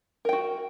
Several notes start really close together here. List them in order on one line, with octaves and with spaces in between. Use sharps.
A#4 G5 F#4